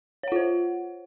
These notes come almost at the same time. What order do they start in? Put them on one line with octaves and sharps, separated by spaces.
C#5 F#5 F4 C5